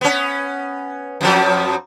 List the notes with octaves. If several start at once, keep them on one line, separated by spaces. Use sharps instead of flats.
B3 C#4
F2 F3 F#3